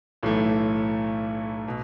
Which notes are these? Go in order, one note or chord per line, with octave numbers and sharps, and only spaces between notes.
B1 A2 E3 A3
B2